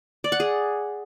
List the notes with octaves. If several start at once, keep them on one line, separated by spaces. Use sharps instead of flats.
D5
F#5
G#4